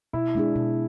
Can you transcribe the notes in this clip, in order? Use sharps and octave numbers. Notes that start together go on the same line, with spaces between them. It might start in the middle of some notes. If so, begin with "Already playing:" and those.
B2 E4
G#3 D4 G#4
B2